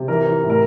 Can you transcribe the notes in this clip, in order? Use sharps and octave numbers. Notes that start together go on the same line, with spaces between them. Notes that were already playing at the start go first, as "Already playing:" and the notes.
Already playing: C3
E3 A#4
E3
A2
A#4